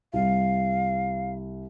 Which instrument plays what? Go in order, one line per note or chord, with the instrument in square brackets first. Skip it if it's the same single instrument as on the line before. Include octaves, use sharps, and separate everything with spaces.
[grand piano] C2 [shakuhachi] F5